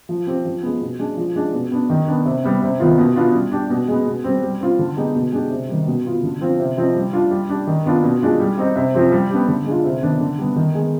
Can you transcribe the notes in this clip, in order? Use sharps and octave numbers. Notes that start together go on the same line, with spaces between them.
F3
C4 G4
F3
G#3 B3
B2
G#3 D4
F3
G#3 D4
B2
B3 D4
D#3
B3 D4
C3
G3 B3
C3
D#3 B3 F4
B2
B3 D4 F4
G3
D4 G4
B2
G#3 B3
B2
G3 C4
G3
C4 F4
D3
G#3 B3 D#4 G4
B2
G#3 D4 G4
C3
D#3 G3
B2
B3 F4
D3
F3 C4 F4
C3
F3 C4 D#4
G3
D4 F4
G3
D4 G4
D#3
B3 D4 F4
B2
G#3 D4 F4
G3
C4 D#4 G4
C3
F3 C4 G4
G3
B3 D4 G4
D3
G#3 D4 F4
C3
D#3 B3 D4
D3
G3 B3
D#3
G#3 B3